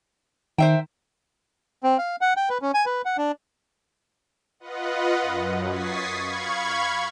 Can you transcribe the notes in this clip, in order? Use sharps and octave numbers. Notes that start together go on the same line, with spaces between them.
D#3 C5 E5 G5
C4
F5
F#5
G5
B4
C#4
G#5
B4
F#5
D4
F4 B4 D#5 F#5
F#2
C#6 D#6 G#6 A6 B6 C7
F5 B5 C#6 G#6